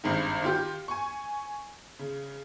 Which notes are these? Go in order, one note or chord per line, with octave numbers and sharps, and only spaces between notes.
G#1 G2 D#3
D#3 F4 G4
G#5 C#6
C#3